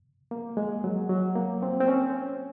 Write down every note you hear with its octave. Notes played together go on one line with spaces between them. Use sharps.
A#3
G#3
F#3
F#3
A#3
C4
C4
C#4